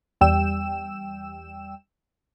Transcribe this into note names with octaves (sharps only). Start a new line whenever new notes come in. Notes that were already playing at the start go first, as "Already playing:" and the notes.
E2 G3 G5 E6 E7